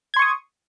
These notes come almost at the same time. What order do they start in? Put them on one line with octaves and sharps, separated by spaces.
G#6 C6 C#6 D#6